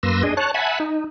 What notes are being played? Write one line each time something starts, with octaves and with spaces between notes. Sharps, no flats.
F#2 A#3 B4 C6 E6 A#6
D4 G#4 D#5
C#5 A5 F#6
E5 F#5 G#5 A5 B5
D#4